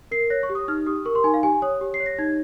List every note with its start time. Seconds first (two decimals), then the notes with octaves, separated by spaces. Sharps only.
0.11 A#4 C7
0.30 C#5 A#6
0.43 C#6
0.49 G4
0.55 D#6
0.68 D#4 F6
0.87 G4 D#6
1.05 A#4 C#6
1.15 C6
1.24 D#4 G#5
1.34 F5
1.43 G4 G#5
1.62 C#5 D#6
1.81 G4
1.94 C7
2.00 C#5
2.06 A#6
2.18 D#4 G#6